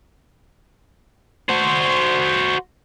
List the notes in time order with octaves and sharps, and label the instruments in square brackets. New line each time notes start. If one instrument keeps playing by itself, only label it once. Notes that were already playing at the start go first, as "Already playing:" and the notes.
[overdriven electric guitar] F#4 C5